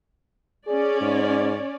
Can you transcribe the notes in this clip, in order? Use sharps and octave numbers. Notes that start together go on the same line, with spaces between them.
C#4 G#4 C#5 D5
G#2